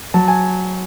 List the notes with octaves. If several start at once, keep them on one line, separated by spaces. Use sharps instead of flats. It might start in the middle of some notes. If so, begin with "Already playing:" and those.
F#3 A5
G#5